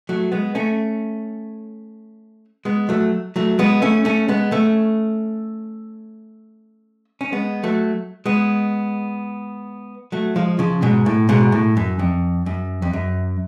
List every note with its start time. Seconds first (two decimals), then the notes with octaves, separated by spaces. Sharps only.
0.09 F#3 A3
0.32 G#3 B3
0.55 A3 C#4
2.65 G#3 B3
2.89 F#3 A3
3.36 F#3 A3
3.59 G#3 B3
3.82 A3 C#4
4.05 A3 C#4
4.28 G#3 B3
4.52 A3 C#4
7.21 C#4
7.32 G#3 B3
7.64 F#3 A3
8.26 G#3 B3
10.12 F#3 A3
10.36 F3 G#3
10.59 C#3 F3
10.82 G#2 B2
11.06 A2
11.29 G#2 B2
11.52 A2
11.77 F#2
11.99 F2
12.46 F#2
12.82 F2
12.93 F#2